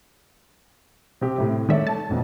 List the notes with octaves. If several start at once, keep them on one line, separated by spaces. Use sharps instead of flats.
C3 C4 G4
A2 C3
D#3 G#3 A3 C#5 D5 E5
A5
A1 F2 B2